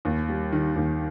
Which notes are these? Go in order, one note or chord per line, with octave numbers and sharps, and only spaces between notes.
D#2
G3
D#3
D#2